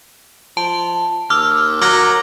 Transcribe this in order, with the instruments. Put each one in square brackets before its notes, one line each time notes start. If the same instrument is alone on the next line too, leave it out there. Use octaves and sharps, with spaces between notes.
[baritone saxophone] F3 [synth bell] A5
[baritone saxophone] D#2 [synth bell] D6 E6 [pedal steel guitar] F6
[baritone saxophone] F#3 [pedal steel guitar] A#4 [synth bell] D6 F6 A#6